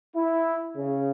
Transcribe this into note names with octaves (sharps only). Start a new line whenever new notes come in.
E4
C#3